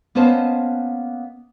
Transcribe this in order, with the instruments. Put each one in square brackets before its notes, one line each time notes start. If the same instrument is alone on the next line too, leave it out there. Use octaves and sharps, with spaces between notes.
[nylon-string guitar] A#3 B3 C#4 C5 D#5 A5